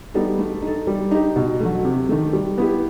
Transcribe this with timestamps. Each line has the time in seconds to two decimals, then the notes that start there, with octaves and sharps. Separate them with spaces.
0.14 G3 B3 D#4 A4
0.38 A3
0.62 D#4 A4
0.87 G3
1.11 D#4 G4
1.36 B2
1.60 F#3 A3
1.85 C3
2.09 D#3 A3
2.33 G3
2.58 B3 E4 G4